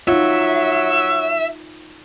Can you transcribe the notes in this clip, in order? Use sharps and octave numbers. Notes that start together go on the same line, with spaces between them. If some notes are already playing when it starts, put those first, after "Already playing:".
F#3 D#4 F4 E5